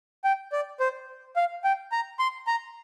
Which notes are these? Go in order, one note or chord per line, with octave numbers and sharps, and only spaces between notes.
G5
D5
C5
F5
G5
A#5
C6
A#5